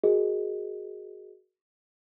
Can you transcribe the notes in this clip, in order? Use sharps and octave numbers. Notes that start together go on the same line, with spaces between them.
F#4 G#4 A#4 D#5